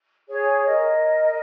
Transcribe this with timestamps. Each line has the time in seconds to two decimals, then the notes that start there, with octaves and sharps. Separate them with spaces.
0.28 G#4 C#5
0.65 A#4 D#5